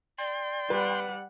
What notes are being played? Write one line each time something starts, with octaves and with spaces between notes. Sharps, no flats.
D5 G5 C6
G3 B4 F#5